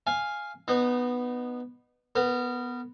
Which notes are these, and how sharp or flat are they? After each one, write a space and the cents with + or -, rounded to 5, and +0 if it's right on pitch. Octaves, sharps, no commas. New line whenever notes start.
F5 +0 G#5 +0
B3 +0 D#4 -30
B3 +0 A#4 -25